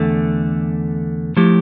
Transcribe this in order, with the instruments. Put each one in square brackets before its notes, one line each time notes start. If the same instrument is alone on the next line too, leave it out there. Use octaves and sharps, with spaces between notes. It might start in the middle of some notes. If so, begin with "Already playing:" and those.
Already playing: [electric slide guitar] E2 D3 A3
F3 A3 E4 G4